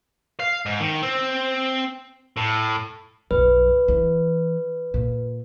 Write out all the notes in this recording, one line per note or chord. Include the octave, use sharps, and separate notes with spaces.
F5
G#2
D#3
C4
A2
B1 F#2 B4
E3
A#2